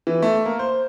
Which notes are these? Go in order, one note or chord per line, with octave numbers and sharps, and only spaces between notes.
E3
A3
A#3
C5